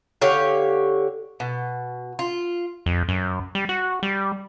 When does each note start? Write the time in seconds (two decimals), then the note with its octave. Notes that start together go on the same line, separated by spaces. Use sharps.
0.21 D3 G4 C#5 F5
1.40 B2
2.19 F4
2.86 F2
3.09 F#2
3.55 G3
3.69 F#4
4.03 G3